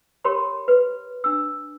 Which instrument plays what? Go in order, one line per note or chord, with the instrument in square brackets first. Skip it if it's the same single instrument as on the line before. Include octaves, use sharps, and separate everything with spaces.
[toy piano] G4 A#4 C#5 B5 C6
B4
D4 E6